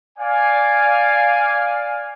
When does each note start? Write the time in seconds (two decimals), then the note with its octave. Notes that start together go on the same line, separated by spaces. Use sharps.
0.19 D5 F5 G#5